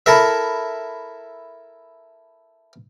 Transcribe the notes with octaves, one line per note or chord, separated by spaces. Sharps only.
E4 A4 A#4 E5